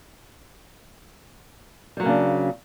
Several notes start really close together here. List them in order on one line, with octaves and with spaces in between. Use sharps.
G3 F#3 A#3 C#3 D4